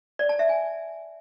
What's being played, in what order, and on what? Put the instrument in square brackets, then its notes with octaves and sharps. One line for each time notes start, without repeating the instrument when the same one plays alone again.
[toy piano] D5
A5
E5
G#5